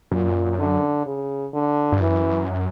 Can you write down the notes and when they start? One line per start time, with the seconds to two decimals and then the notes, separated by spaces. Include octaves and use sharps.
0.12 F#2 A#2
0.59 D3
1.06 C#3
1.53 D3
1.92 G2
2.01 F#2 E3